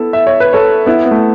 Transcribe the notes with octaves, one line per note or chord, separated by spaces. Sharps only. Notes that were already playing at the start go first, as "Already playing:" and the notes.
Already playing: B3 E4 A4
E5
C#5
B4
A4 C#5
B3 E4
B3
A3